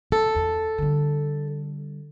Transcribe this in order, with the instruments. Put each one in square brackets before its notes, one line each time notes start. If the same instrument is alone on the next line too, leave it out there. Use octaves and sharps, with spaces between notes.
[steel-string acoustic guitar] A4
[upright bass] E2
D3 G3